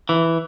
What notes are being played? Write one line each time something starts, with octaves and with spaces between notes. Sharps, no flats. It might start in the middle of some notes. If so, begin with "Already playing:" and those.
E3